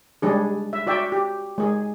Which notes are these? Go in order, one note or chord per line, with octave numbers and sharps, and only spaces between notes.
G3 G#3 D4 G#4
E5
F#4 D5 E5 G5
G4
G#3 G#4